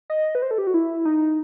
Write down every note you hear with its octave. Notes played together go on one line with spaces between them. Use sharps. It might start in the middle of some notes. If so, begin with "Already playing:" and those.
D#5
B4
C5
A4
G4
F#4
E4
D#4